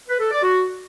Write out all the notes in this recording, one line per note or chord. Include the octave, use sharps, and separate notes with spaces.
B4
A4
D5
F#4